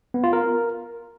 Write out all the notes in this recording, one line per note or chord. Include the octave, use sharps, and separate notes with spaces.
B3
F4
A#4